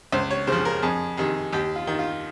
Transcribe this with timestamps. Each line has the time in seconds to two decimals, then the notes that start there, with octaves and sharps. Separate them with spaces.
0.12 C#2 C5
0.30 C#5
0.47 C#3 F3 C5
0.65 A#4
0.83 F2 G#4
1.17 C3 D#3 G#4
1.52 D#2 G4
1.76 F4
1.87 D#3
1.99 F4